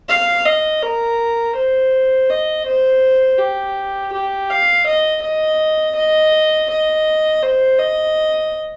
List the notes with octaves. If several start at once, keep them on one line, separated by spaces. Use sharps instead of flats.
F5
D#5
A#4
C5
D#5
C5
G4
G4
F5
D#5
D#5
D#5
D#5
C5
D#5